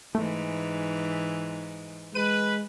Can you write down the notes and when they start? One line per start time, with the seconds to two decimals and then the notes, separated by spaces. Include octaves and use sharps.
0.15 G#2 E3 A3
2.15 G#3 B4 D#7